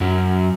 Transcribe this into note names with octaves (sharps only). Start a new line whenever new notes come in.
F#2